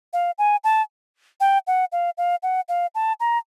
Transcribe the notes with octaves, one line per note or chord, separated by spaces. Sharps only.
F5
G#5
A5
G5
F#5
F5
F5
F#5
F5
A5
A#5